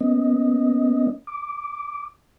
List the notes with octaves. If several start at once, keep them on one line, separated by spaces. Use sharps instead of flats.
A#3 B3 C#4 D#5
D6